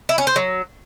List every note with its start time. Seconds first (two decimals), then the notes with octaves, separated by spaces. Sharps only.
0.09 E4
0.18 C#4
0.27 C5
0.36 F#3